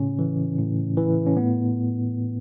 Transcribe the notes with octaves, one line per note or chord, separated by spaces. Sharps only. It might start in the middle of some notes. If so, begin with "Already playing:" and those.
Already playing: A2 C#3 C#4
E3
A2
E3
C#4
A2 B3